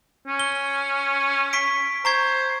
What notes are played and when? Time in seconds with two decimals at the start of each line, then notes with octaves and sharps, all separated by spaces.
0.27 C#4
0.40 G7
1.53 C#6 B6 D7
2.05 C5 A#5 C#6 G#6